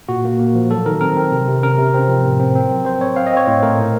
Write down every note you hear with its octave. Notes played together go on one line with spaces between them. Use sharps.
A#2 F#4
A#3
A#3
F3
F#3 A4
D#3 A#4
C4 A#4
C4
C3
C3
C#4 A#4
C3
C4
F3
A2
C4
C4
F#3
C4 C5
C4 C#5
C4 F5
D#5
C4 C#5
A2 C5
A3 A#4
A#2